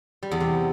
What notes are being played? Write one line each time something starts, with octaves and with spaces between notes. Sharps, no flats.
G3
E2
C3